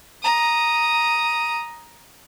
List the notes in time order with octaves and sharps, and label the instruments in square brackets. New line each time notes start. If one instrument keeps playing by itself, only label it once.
[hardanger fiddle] A#5 D#6